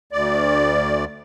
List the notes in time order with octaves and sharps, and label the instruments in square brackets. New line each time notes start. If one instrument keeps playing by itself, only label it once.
[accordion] D2 D5